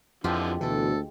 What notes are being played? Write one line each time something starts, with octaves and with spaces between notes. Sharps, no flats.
F2 D3 E3 F3 G#3 F4 G4
D2 B2 E3 A4